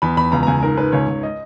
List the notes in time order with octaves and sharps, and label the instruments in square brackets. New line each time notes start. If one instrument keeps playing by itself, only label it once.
[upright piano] E2 B5
E2 B5
C#2 A#5
A#5
C#2 G#5
G#2 A#4
G#2 B4
C#2 C#5
C#2
D#5